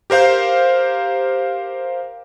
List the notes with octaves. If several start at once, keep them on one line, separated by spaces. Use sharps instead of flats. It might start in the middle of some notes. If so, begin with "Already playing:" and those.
G4 A#4 C5 F5 G6